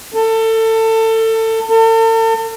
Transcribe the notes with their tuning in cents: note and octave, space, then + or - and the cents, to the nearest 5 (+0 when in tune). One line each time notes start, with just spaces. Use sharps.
A4 +25
A4 +40